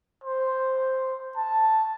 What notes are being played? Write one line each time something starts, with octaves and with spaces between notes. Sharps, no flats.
C5
A5